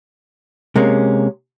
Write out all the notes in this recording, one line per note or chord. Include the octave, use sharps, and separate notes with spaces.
C3 G#3 A#3 C#4